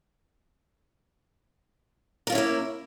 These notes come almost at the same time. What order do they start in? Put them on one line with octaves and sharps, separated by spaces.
A#4 F4 C#4 E4 A#3